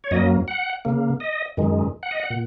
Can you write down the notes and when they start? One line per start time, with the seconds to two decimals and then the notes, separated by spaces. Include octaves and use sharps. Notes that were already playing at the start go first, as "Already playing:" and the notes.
0.04 C#5
0.11 F#2 F#3 A#3 D#5
0.48 F#5
0.85 C#3 A#3
1.20 D#5
1.57 F#2 D#3 G#3
2.03 F#5
2.11 D#5
2.20 F#5
2.30 A#2